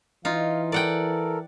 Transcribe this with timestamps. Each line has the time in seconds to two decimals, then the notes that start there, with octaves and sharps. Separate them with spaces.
0.25 E3 D#4 F4 F5
0.72 A4 A#4 D5 F#5 G5